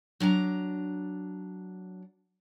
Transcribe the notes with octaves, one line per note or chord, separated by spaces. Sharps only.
F#3 D4 G#5 A#5